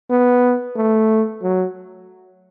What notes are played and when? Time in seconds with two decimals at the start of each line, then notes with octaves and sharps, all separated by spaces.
0.10 B3
0.76 A3
1.43 F#3